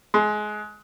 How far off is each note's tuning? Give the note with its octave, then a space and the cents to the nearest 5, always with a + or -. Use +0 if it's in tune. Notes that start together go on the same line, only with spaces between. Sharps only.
G#3 +25 C6 +0